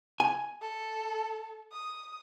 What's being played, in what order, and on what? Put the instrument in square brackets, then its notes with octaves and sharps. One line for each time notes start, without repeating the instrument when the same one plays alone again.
[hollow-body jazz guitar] G#5
[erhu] A4
D#6